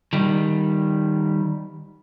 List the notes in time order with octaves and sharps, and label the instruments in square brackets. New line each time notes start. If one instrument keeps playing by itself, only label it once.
[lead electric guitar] D#3 G3